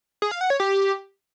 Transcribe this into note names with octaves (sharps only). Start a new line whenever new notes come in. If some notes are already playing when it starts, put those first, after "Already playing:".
G#4
F5
F#5
C#5
G4